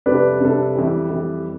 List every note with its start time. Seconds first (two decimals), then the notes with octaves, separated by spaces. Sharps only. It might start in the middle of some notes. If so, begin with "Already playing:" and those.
0.06 F2 C3 G3 D4 A4 B4 D5
0.40 F2 C3 G3 D4 A4
0.75 F2 E3 G3
1.09 F2 E3 G3